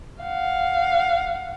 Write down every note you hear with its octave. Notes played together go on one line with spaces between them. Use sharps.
F5 F#5